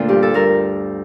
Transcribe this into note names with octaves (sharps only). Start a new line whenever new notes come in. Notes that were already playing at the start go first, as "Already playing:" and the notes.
Already playing: D2 A#2 A#3 D4 F4
G2 G4
A4
G2 A#4